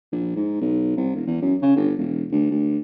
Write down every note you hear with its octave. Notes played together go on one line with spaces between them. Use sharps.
A#1
G#2
B1
C2
E1
E2
F#2
C#3
G1
E1
D2
D2